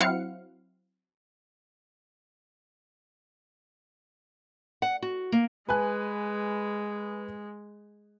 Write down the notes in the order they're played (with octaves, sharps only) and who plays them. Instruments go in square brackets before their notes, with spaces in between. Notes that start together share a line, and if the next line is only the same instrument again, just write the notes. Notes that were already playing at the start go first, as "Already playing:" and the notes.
[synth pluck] F#3 C4 E4 F5 F#5 C#7
[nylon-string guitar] F#5
F#4
A#3
[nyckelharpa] G#3 [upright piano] B4 G#5 F#6